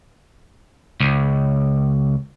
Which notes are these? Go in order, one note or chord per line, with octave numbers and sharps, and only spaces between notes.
C#2